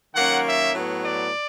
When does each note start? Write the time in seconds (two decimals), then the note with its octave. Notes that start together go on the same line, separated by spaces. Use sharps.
0.15 D#3 F#3 A#3 C#4 F#5
0.45 E5
0.73 A2 F#3 B3
1.02 D5